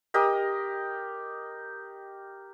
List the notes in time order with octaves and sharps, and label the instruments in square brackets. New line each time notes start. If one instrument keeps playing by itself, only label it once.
[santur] G4 A#4 D#5